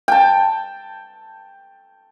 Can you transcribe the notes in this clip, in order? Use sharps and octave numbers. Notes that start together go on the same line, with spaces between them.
G5 A5